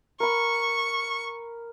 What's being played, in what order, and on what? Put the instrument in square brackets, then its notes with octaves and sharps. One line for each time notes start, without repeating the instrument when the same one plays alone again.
[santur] A#4 B5 [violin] C#6